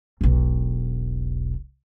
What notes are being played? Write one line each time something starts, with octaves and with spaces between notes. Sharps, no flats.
E1 B1